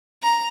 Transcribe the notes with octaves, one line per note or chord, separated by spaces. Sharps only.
A#5